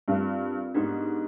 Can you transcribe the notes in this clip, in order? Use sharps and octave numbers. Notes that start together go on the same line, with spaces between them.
G2 C4 F4 A#4
G#2 B3 D4 G4 A#4